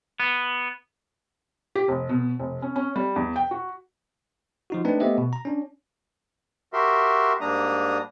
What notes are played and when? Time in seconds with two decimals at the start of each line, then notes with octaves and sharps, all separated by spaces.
0.20 B3
1.75 G4
1.88 F1
2.09 B2
2.39 F1
2.62 C#4
2.76 C#4
2.96 G3
3.16 E2
3.36 G5
3.51 F#4
4.70 F3 D#4 F#4
4.85 A3 C4 D4 D#4 B4
5.00 A3 B3 G4 C5 D#5 E5
5.18 B2
5.33 A#5
5.45 C#4 D4
6.73 F#4 G4 A#4 E5 C6
7.41 G#2 G3 A#3 D4 A#5 D#6